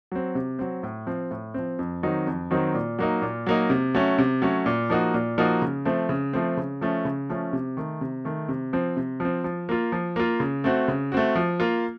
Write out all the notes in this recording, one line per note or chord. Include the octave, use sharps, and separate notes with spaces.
F#3 C4
C3
F#3 C4
A2
F3 C4
A2
F3 C4
F2
D#3 F#3 C4 D#4
F2
D#3 F#3 C4 D#4
A#2
F#3 A#3 D#4
A#2
F#3 A#3 D#4
C3
F#3 A3 C#4
C3
F#3 A3 C#4
A#2
F3 A#3 D#4 F#4
A#2
F3 A#3 D#4 F#4
C#3
F3 A3 C4
C#3
F3 A3 C4
C#3
F3 A3 C#4
C#3
F3 A3 C#4
C3
D#3 A3
C3
D#3 A3
C3
F3 C4
C3
F3 C4
F3
A#3 F4
F3
A#3 F4
C#3
A3 C4 F#4
C#3
A3 C4 F#4
F3
A#3 F4